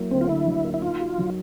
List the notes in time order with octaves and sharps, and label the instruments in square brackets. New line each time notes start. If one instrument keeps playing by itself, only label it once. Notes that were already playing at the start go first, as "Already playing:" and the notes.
Already playing: [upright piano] F#3 A#3 E4
[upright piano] D2 [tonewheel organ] C4
[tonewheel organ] F4
[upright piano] D3 [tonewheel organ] E4
[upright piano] F#3
A#3
[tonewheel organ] E4
[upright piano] D#4 [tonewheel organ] F4
[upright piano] F#4
F#3